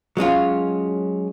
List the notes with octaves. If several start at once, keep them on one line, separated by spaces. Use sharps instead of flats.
F#3 G#3 C#4 F4